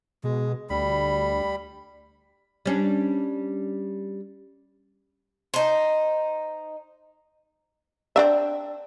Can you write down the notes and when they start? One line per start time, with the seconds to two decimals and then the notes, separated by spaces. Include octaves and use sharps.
0.24 B2 G#3
0.70 D2 G3 B5
2.66 G3 C#4 D4
5.54 D#4 C5
8.16 C4 D4 E5